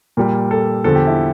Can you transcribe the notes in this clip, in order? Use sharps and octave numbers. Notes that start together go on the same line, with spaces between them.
A#2 G3 A#4
A4
E2 D3 F3 A4
G4
E4